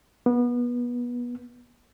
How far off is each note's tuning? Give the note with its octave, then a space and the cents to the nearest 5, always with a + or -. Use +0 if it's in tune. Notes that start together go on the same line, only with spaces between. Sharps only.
B3 -25